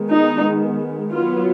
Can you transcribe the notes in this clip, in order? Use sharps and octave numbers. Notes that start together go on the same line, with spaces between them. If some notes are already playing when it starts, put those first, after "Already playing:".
Already playing: D#3 G#3 B3
D#4
F#3 B3 F4